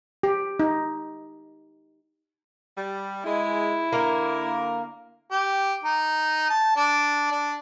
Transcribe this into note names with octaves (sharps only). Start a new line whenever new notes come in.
G4
D#4
G3
G#3 E4
D3 A#3 A#4
G4
D#4
A5
D4
D4